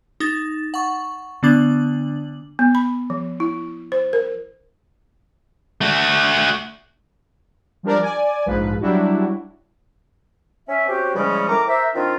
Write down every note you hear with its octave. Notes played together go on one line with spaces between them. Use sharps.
D#4 A6
F#5 C#6
D3 B3 D4 D6 F#7
B3
B5
F3
E4
C5
A#4
A3 F#4
F3 G3 D4 A#4 D5
D5 G#5
A#1 G#2 F3 B4
F#3 G3 D4 E4 F#4
C#4 E5
C4 C#4 F#4 G4
C#3 E3 F3 G3 G#3 C#4
A2 D#3 A#4 A#5 D6
A#4 C5 E5
D#3 C4 D4 D#4 F4